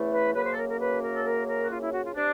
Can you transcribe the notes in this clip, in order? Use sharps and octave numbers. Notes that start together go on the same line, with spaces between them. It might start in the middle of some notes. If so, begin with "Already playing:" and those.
Already playing: E2 C#3 E3 A3
B4
F#2 C#3 F#3 A#3 B4
C5
A4
A#4
A#4
B4
A#4
A4
A#4
A#4
F#4
F4
E4
F#4
F4
C3 D4